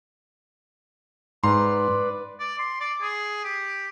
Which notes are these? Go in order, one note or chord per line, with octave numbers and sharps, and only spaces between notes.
G#2 B4 D5 A#5 C6
D5
C6
D5
G#4
G4